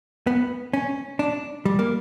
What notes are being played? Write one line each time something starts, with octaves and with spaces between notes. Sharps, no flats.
B3
C#4
D4
G3
A#3